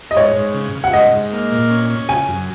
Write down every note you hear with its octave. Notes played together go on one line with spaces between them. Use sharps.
D#5
G#2 C#5
G#2
C#3
C#3
F#5
G#2 D#5
G#2
A#3
A#2
C#4
C#4
C#3 G#5
F#2